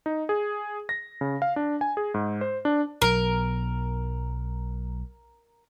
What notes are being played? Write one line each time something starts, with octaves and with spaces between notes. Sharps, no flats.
D#4
G#4
A#6
C#3
F5
D4
G#5
G#4
G#2
C5
D4
B1 F#3 A#4